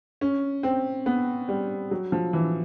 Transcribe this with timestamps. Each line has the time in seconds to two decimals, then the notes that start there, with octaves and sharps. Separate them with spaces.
0.21 C#4
0.63 C4
1.06 B3
1.48 G3
1.91 F#3
2.12 F3
2.33 E3